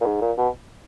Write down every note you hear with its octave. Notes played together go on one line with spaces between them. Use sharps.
A#2
G#2
A#2
B2